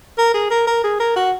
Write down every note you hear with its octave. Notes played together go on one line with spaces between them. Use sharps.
A#4
G#4
A#4
A#4
G#4
A#4
F#4